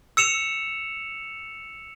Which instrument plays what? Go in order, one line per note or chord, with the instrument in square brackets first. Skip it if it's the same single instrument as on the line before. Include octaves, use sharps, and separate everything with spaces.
[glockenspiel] E6 C#7 E7 F7